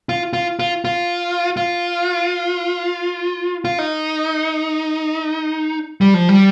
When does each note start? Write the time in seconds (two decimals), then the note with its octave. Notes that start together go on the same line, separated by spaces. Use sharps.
0.09 F4
0.33 F4
0.59 F4
0.85 F4
1.57 F4
3.65 F4
3.79 D#4
6.01 G3
6.14 F3
6.29 G3